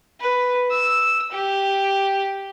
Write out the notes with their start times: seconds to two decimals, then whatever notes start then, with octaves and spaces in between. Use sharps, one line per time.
0.20 B4
0.71 E6
1.31 G4